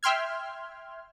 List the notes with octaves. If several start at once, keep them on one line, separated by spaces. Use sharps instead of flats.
E5 G5 C6 F6 G#6